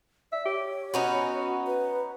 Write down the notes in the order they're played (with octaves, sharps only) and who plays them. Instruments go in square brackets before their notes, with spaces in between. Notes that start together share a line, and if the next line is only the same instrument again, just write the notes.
[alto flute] D5 [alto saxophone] E5
[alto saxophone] G4 [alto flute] C#5
[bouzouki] B3 C#4 D#4 [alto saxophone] F#4
[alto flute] B4